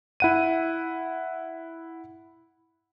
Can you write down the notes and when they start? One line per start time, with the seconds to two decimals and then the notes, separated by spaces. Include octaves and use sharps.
0.20 E4 F#5 D#7